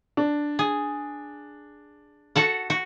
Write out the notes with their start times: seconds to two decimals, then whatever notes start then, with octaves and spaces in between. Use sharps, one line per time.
0.17 D4
0.59 G#4
2.36 F#4 A4 F#5
2.70 F#4